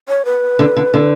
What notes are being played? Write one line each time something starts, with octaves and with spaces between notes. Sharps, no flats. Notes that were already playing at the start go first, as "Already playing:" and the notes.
C#5
B4
D3
D3
D3